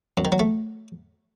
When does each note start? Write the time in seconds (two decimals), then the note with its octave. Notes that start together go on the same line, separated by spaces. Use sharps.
0.17 F#2
0.25 D#3
0.32 F#3
0.40 A3